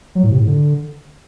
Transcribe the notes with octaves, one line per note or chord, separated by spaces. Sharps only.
F#3
A2
C3
A2
D3